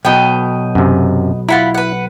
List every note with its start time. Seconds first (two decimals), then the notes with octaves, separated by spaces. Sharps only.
0.05 B1 B2 F#3 D#5 G5
0.75 F#2 C3
1.49 E4 F4 F#5 B5
1.75 B4 F#5